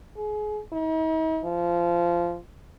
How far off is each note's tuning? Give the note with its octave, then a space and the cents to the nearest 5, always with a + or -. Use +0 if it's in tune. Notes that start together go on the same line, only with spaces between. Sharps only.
G#4 +30
D#4 +45
F3 -15